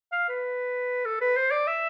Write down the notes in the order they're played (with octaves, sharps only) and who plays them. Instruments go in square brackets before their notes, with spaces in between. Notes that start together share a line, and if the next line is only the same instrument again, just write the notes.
[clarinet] F5
B4
A4
B4
C5
D5
E5